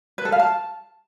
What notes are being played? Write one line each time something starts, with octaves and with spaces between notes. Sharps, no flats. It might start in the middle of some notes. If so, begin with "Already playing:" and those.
B4
A4
F5
A5